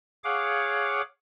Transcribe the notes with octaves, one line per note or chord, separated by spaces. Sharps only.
G#4 C#5 F5 F#5 D6